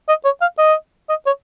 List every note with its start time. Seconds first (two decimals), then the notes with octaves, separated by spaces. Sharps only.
0.08 D#5
0.25 C#5
0.41 F5
0.58 D#5
1.09 D#5
1.26 C#5